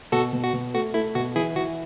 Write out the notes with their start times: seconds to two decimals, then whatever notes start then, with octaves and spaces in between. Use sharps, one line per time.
0.12 B2 F#4 A4
0.33 B2
0.43 F#4
0.53 B2
0.74 A3 F#4
0.94 A3 E4
1.15 B2 F#4
1.36 E3 E4 G#4
1.56 E3 F#4